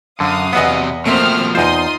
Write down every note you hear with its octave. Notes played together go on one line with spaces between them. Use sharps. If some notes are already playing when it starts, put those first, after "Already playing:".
F#2 D3 F5 D#6
E2 C3 F#3 B3 D#5 E5 F#5
B2 F3 A3 A#3 C4 C5 E5 F6
E2 D#4 F4 C5 C6 D#6